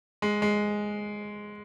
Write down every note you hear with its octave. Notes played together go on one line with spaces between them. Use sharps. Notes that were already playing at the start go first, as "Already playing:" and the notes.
G#3
G#3